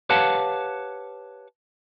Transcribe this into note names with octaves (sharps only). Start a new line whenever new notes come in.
G4 B4 C#5 F5 F#5 A5